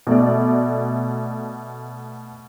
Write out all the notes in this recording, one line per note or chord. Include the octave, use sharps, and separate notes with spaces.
B2 A3 D5